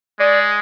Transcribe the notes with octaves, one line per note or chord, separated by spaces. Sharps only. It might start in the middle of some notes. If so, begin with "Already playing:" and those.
G#3 D5